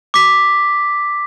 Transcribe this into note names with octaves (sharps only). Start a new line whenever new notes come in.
D6 B6